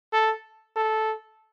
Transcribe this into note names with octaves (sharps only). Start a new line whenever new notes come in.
A4
A4